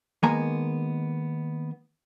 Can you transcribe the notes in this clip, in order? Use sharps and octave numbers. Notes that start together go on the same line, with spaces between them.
D#3 G#3 A#3 B3 G#5 A#5